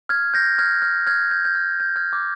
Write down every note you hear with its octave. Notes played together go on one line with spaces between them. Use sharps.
F6 G#6
G6 A#6
F6 G#6
F6
F6 G#6
G6
G6
F6
G6
F6 G#6
D6